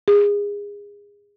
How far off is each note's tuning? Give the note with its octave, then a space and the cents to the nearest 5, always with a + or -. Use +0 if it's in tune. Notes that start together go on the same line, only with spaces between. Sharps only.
G#4 -25